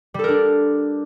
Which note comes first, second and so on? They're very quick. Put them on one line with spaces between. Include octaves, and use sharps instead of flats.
G3 A4 A#4 D4